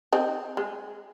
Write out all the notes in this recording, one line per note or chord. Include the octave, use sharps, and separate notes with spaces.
C4 D#4
G#3